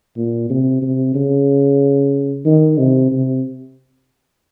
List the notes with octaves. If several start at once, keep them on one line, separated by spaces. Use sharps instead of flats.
A#2
C3
C3
C#3
D#3
C3
C3